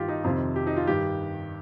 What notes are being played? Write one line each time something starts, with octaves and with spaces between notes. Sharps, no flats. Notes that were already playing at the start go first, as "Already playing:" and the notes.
Already playing: G2 D#3 F4 G4
D#4
F2 C3 D#3 F4
G4
D#4
F4
G2 D#3 G4